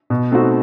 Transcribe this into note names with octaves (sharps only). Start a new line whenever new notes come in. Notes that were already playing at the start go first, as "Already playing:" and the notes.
B2
A3 C4 D#4 F#4